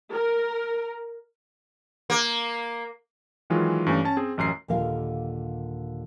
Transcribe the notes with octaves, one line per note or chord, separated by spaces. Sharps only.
A#4
A#3
D#3 E3 F#3 G#3 F4
G2 E3 A3 C#4
C#4 A5
C4 G#4
A1 F#2 A#5 C7
D#2 A#2 D3 A#4 F5